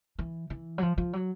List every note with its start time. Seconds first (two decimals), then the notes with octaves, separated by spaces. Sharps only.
0.19 E3
0.50 E3
0.78 F#3
0.82 F3
0.98 F3
1.13 F#3